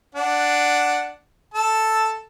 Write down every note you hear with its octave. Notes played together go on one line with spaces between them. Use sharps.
D4 F#5
A4 A5 E6